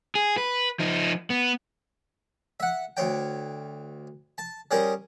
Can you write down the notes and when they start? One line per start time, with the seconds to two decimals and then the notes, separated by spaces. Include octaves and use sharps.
0.15 G#4
0.38 B4
0.79 F3 D#4
1.30 B3
2.60 E5 F#5
2.97 D2 C#5 G5
4.38 A5
4.71 G3 C#4 G#4 A#4 C5